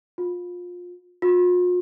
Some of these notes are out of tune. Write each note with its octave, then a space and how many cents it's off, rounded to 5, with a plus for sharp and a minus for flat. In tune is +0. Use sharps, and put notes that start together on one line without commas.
F4 +25
F4 +45